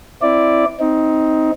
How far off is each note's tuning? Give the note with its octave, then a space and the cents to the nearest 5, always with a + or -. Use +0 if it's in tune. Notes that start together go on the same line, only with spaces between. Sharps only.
C4 +0 E4 +0 D5 +0
C4 +0 D#4 +15